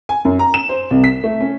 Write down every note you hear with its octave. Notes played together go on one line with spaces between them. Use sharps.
G#5
F#2
A#5
E7
C5
C2
B6
A3
C#4